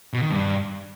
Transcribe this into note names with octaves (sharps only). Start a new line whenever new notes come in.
B2
D#3
G2